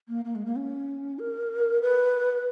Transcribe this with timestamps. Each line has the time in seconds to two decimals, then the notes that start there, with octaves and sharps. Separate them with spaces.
0.08 A#3
0.25 A#3
0.35 G#3
0.45 A#3
0.56 C#4
1.19 A#4
1.82 B4